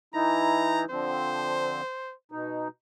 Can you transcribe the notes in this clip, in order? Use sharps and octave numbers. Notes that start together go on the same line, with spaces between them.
E3 D#4 E4 A#5
D3 F3 C4 C5
B2 D#4